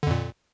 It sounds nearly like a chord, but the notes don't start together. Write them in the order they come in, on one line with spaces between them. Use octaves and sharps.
D3 F2 A#2